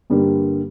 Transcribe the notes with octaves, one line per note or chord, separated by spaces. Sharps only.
G2 D3 G3 A#3